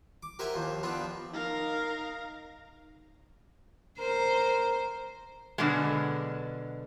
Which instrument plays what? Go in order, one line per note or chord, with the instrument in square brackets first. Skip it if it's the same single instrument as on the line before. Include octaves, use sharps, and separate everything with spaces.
[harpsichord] D6
G4 A#4 C5 E5 F#5 G#5
D#2 F3
F3 B3 C4 D4
[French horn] D#4 [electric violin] A#4 F5
[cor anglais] A#4 [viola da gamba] C5
[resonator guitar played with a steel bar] B2 D3 F#3 G#3